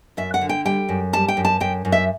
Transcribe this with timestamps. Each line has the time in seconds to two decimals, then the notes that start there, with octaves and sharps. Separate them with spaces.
0.17 F#2 E5
0.34 F#5
0.41 D3
0.49 G5
0.65 G3 G5
0.89 F#2
1.13 G3 A5
1.28 G5
1.37 F#2
1.45 A5
1.60 F#2 G5
1.85 F#2
1.92 E5